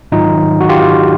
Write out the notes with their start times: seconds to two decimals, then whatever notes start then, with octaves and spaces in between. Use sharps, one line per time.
0.12 G#2 D#3 F#3 D#4 F4
0.61 F#4
0.69 F4 G4